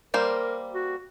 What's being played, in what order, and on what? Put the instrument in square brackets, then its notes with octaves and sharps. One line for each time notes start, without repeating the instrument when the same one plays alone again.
[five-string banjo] G3 A#3 C5 [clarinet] A#4
[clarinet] F#4